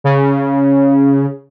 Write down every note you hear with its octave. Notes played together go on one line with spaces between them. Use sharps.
C#3